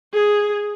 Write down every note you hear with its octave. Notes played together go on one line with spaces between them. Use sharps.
G#4